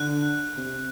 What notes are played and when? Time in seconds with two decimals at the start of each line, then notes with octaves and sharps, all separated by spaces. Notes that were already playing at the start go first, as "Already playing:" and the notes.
Already playing: D3 F#6
0.57 C3